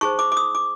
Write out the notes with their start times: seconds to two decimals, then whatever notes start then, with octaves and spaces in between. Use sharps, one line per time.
0.01 D#4 G#4 C5 C#6
0.19 D6
0.32 D6
0.37 D#6
0.55 D6